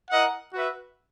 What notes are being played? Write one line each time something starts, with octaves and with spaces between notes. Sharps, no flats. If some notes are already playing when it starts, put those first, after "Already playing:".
E4 A#4 D#5 F#5
F#4 B4 E5